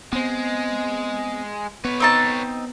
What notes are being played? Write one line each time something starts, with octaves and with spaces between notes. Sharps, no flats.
G#3 B3 C4
B3 B4 C#5
C4 D#4 A5